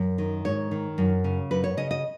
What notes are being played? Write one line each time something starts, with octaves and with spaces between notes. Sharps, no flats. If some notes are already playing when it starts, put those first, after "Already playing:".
Already playing: F#2
D#3
G#2 C#5
D#3
F#2
C#3
F#2 B4
C#5
C#3 D#5
D#5